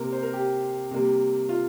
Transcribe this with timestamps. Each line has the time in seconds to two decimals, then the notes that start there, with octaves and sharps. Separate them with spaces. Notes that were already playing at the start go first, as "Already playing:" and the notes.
Already playing: C3 A#3 A#4
0.12 C5
0.23 A#4
0.33 G4
0.91 C3 G3 A#3
1.49 F4